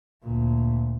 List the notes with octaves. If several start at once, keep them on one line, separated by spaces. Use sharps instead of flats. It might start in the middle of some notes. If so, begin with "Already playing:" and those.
D2 A#2